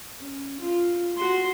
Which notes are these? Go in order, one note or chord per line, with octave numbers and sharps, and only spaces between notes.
C#4
F4
F#4 C6